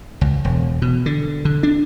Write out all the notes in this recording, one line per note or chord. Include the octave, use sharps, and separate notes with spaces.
C#2
E1
B2
D3
D3
D4